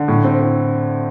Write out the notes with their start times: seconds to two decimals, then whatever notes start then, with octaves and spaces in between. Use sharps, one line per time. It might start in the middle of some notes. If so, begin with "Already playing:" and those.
Already playing: D3
0.08 A2
0.24 C4
0.40 A2